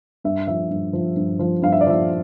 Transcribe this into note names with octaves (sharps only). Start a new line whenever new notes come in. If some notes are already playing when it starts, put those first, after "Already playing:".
G2 E5
F3 E5
G2
F3
G2
F3
G2 F5
E5
D5
F3 E5